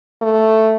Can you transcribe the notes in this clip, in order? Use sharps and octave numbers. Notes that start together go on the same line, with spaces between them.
A3